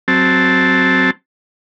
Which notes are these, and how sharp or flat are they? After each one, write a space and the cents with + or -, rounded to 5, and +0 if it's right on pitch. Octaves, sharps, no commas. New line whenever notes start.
F#3 +0 C4 +0 A5 +0